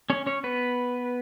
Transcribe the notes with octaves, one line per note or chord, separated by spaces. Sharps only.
C#4 C#5
C#4 C#5
B3 B4